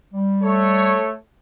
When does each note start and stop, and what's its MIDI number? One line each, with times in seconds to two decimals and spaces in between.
0.13 0.98 55
0.43 1.13 57
0.43 1.13 69
0.43 1.13 73